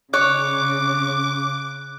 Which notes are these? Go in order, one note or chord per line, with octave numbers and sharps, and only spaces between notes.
C#3 C#5 D6 F#6